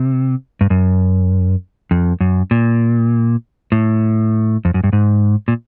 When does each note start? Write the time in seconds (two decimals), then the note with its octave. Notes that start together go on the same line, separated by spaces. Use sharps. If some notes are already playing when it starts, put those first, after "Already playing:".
Already playing: C3
0.61 G2
0.70 F#2
1.91 F2
2.20 F#2
2.51 A#2
3.72 A2
4.65 F2
4.74 F#2
4.84 G2
4.93 G#2
5.48 A#2